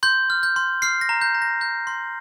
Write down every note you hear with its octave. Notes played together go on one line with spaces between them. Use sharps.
C6 G6
F6
G6
C6
F6 C7
A#6
A#5
G6
A#5
A#6
G6
C6